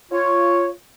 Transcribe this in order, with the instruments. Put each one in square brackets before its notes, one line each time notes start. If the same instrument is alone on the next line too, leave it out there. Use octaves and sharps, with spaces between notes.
[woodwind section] F4 C#5